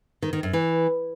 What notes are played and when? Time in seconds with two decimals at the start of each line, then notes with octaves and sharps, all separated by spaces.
0.22 D#3
0.33 D#3
0.43 F#2
0.53 E3